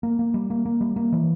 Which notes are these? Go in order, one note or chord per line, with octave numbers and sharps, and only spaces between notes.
A#3
A#3
G3
A#3
A#3
G3
A#3
E3